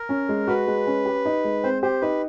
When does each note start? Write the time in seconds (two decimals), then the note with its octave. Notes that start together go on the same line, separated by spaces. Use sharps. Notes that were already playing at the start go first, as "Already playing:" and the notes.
Already playing: A#4
0.09 C#4
0.29 G#3
0.48 F#4 B4
0.67 G#3
0.87 C#4
1.05 G4
1.25 D#4
1.44 G#3
1.64 C4 C5
1.82 G4 C5
2.01 D#4 B4